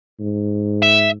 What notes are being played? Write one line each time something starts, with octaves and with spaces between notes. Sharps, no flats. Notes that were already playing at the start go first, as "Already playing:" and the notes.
G#2
E5